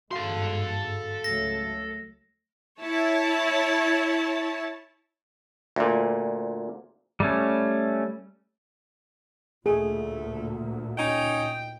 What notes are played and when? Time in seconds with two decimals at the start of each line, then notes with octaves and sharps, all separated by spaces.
0.11 G1 G#2 F#4 A4 F5 C6
1.24 C#2 F#3 A3 A#6
2.80 E4 C#5 A5
5.76 D2 A#2
7.20 G3 A3 C#4
9.66 D2 A#2 A3 G#4
10.98 C#4 D#4 G5